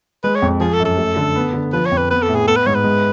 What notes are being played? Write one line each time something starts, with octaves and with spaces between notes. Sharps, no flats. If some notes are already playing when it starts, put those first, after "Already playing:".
G#3 B4
C#5
F2
F3 G#4
A4
F#2
A4
A3
D3
B3
D3
F3 B4
C#5
F2
B4
B3 B4
A4
A2
G#4
B3 A4
B4
G#2 C#5
B4
G#3